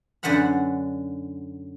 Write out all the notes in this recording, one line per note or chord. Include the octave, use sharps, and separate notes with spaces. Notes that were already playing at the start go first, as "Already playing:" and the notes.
F#2 D3 B4 C5 F#5 B5